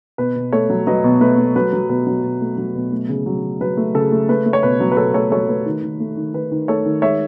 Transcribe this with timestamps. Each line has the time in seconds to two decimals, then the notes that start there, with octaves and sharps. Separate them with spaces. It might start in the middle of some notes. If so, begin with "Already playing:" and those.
0.18 B2 B4
0.36 B2
0.53 A3 A4 C#5
0.70 F#3
0.87 F#3 B4 D#5
1.04 B2
1.21 A3 B4
1.38 A3
1.56 F#3 B4
1.73 F#3
1.89 B2 B4
2.07 F#3
2.23 B2
2.41 A3
2.58 F#3
2.75 B2
2.92 A3
3.09 C#3
3.26 F#3
3.43 C#3
3.61 F#3 B4
3.77 A3
3.94 C#3 A4
4.12 A3
4.29 A3 B4
4.46 A3
4.53 C#5
4.63 B2 B4
4.80 F#3
4.92 B4
4.97 B2 A4 C#5
5.14 A3 A4 C#5
5.31 F#3 A4 C#5
5.49 A3 B4
5.66 D#3
5.83 D#3
6.00 A3
6.17 D#3
6.34 D#3 B4
6.52 D#3
6.68 A3 A4 C#5
6.86 D#3
7.02 G#3 C#5 E5